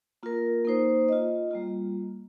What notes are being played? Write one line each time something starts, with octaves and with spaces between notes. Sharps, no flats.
A#3 F4 A#4
A#3 D#4 C5
F4 D#5
G3 A#3 F4